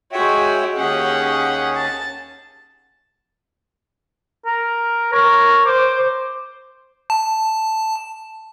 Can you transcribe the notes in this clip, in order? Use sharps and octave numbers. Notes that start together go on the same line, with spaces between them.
G#3 F#4 C#5 E5 G5
D#2 C#4 G4 G#4 F#5
A5
A#4
A#4 C#5
C5 D6
A5